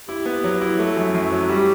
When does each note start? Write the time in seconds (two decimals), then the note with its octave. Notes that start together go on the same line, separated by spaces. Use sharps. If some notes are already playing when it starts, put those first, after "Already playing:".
0.09 E4 G4
0.26 B3
0.44 F#3
0.61 E4
0.79 A3 F#4
0.97 F#2
1.14 F#2
1.32 F#3
1.49 G3 G4